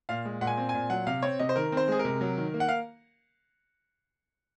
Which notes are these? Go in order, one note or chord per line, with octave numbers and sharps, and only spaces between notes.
A#2 F5
G#3
A#2 F#5
G#5
C4
G#5
A#2
F#3 F#5
C3 F5
C4 C#5
C3 D#5
C5
D#3 A#4
C4 C5
G#3 G#4
A#4
C3
F#3
D#3
A#3
F#5
F5